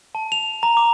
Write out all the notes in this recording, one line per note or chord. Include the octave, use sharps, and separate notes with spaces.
A5
F7
A#5
D6